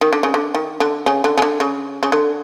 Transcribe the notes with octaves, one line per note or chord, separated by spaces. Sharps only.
D#3
D3
C#3
D3
D#3
D3
C#3
D3
C#3
D3
C#3
C#3
D3